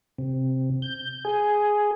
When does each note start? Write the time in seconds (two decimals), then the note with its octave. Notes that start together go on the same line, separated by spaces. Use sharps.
0.18 C3
0.82 G6
1.25 G#4